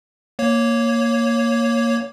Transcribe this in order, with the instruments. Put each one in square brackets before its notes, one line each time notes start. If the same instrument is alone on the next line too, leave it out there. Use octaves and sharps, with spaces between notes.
[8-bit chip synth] A#3 C#5